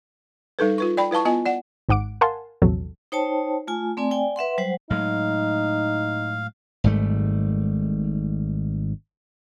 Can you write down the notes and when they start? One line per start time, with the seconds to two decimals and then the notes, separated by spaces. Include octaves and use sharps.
0.59 G3 D#4 A4 B4
0.78 F4 B4 C#6
0.97 D5 G5 B5
1.11 E4 B4 F5 A5 C#6
1.25 B3 F4 D#5 G#5
1.46 D5 F#5
1.89 G#1 G#2 F#5 D6 D7
2.21 A#4 F5 F#5 G#5 A5 C6
2.62 A#1 E2 C3 F#3 A4
3.12 D#4 C5 C#5 G5 A5
3.67 A3 F4 G#5
3.97 A3 C4 D5 G#5
4.11 D5 G5 G#5
4.36 B4 E5 F#5 C6
4.58 F#3 G3 C5 F#5
4.90 A2 F#3 G#3 D#4 F5
6.84 G#1 G#2 G3 A3